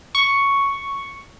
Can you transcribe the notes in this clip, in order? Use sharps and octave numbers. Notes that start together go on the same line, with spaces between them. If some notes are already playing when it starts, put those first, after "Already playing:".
C#6